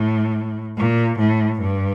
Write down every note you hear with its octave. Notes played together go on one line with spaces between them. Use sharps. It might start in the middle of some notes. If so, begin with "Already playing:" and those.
Already playing: A2
A#2
A2
G2